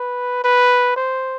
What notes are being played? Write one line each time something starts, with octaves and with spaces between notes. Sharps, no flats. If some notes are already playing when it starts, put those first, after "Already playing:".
Already playing: B4
B4
C5